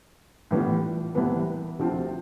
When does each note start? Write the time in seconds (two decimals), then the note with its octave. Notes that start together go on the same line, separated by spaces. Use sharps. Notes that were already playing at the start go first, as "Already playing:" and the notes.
0.51 A2 E3 G3 B3 F4
1.15 C2 C3 E3 B3
1.79 D2 C3 F3 C4 F4